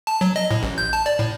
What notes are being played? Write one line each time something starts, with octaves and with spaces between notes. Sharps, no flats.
A5
F#3
D#5
A2
A1
G6
A5
D5
A2